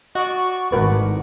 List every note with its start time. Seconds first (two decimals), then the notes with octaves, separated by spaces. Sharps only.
0.15 F#4 D5 D#5 C#6
0.72 G#1 A2 D#3 F#4 A#4 B4 D5 F#5